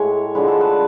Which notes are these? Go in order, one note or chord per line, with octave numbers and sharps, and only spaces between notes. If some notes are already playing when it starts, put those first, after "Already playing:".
Already playing: A2 G#3 C#5
D3 F3 G#3 B4
A4
B4